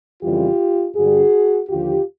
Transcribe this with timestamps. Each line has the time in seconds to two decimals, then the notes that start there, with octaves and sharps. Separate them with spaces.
0.22 F2 C#3 E3 G3 F4 G4
0.95 G2 D3 G3 F#4 G#4
1.69 D#2 D3 F3 F4 G4